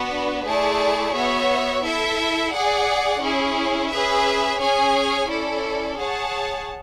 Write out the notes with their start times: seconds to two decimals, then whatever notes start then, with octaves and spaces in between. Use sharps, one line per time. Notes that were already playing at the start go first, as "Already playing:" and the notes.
Already playing: B3 D4 F#4 B4
0.46 A3 E4 G#4 D5 A5
1.14 B3 F#4 C#5 E5
1.83 E4 A4 E5
2.53 G#4 D5 F#5
3.22 C#4 E4 G#4
3.90 C#4 G#4 B4 E5
4.60 C#4 G#4 C#5 G#5
5.28 C#4 E4 A4 D5
5.98 G#4 C#5 F#5 A5